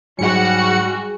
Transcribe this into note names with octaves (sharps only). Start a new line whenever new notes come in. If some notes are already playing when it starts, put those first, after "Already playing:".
G#2 F#3 G3 F#4 G#4 F#5 G#5 C#7